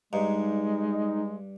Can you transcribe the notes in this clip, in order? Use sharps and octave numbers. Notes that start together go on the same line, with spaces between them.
G2 G#3 D#4